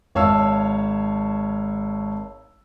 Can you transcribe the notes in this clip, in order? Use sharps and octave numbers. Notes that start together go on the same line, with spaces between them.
G#1 C#5 E5 F5 A5 E6